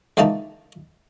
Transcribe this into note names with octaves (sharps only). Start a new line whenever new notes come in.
C#2 E3 A#3 D#4 A5